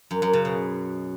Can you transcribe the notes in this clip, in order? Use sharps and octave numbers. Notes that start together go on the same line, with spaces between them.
F#2
F#2
C#3
B2